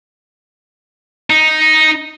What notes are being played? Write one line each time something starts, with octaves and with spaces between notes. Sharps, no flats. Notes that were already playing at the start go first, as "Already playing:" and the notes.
D#4